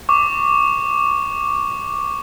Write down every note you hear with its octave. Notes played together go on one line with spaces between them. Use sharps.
C#6 D6